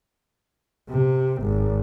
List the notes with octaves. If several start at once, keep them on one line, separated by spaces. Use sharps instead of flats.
C3
G#1